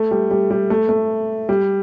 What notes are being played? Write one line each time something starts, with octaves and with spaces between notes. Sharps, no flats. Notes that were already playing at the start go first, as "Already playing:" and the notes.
Already playing: A3
G3
G3
G3
A3
A3
G3